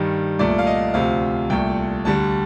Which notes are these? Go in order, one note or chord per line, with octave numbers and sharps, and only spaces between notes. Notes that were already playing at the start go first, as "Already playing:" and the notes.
Already playing: G2 D#3 G3
C2 A#2 A3 D5
F5
D#5
D2 C3 F3 F5
C2 A#2 A3 G5
D2 D3 G3 A5